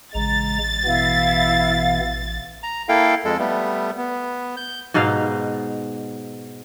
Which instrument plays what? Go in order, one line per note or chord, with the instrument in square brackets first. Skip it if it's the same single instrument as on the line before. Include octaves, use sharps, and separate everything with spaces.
[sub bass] A1 [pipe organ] C#3 G#3 A#5 [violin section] A6
[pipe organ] B2 E3 B3 [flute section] E4 F5
[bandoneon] A#5
A#3 E4 A4 F5 G5
F2 G#3 A4
G3 A3 B3
B3
G6
[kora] G#2 B2 D#4 F5